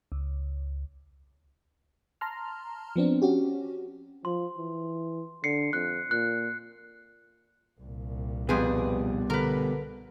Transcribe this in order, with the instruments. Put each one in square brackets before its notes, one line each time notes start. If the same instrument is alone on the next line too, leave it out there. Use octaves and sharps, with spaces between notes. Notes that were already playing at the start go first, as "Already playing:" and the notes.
[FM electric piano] C#2
A5 A#5 C6 F6
F3 B3 C4 D4
C#4 F#4 G4
[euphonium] F3 [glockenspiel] C6
[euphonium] E3
[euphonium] D3 [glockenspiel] C7 C#7
[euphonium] F2 [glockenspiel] F#6
[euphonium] A#2 [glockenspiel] F#6
[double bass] C2 A#2
[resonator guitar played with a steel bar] F2 G#4 [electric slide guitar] B2 G3 [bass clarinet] B4
[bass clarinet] D3 [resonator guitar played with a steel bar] A#4 B4